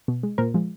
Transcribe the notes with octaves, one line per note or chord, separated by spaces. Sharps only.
B2
G#3
A#2 A#4 C5
F3 G#3